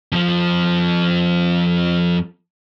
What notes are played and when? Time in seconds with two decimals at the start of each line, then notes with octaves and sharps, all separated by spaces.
0.12 F2 F3